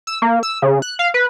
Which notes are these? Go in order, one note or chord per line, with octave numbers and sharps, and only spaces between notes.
E6
A#3
E6
C#3
F#6
F5
B4